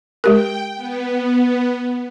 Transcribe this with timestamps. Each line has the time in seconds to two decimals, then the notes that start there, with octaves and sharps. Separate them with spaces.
0.24 G#3 G4 A#4 G5
0.76 B3